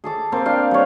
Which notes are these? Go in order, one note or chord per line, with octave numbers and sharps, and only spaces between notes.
G#4 A4 D6
A#3 C4 A4 C5
D4 F5 G5
G3 C#5